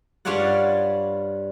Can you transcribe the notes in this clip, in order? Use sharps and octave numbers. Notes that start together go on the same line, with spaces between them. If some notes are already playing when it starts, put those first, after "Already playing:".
G2 G3 F4 C#5 D5 F#5